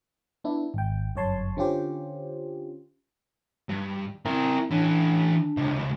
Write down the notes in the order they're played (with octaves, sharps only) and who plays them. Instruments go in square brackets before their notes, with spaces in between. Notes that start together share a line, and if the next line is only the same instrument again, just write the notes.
[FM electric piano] B3 D4 E4
G#1 G5
G1 F#2 C#5 A5 C6
D3 C#4 F4 G4 C5
[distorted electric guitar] G2
[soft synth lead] C4 [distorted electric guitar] E4 A#4
[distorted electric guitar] E3 C#4 [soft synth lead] D4
[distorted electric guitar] C#2 C3